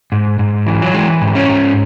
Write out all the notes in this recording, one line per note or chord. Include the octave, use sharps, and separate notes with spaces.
G#2
G#2
E3
F#3
E3 G#3
G#2
C#4
G#2